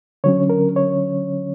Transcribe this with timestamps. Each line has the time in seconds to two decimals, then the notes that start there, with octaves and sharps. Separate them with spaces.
0.24 D3 F#3 C#4 C#5
0.50 A#4
0.76 C#5